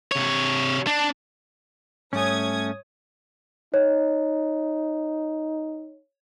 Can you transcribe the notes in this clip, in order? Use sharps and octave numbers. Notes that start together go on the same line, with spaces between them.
C3 C#5
D4
G#2 G3 A3 C#4 C#5 G#5 D#6 G#6
D#4 C#5